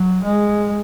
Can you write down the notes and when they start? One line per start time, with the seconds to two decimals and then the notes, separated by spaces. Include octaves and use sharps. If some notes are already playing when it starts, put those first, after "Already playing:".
Already playing: F#3
0.23 G#3